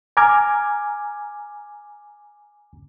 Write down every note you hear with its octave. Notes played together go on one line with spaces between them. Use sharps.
G#5 A#5 D6 F6 G#6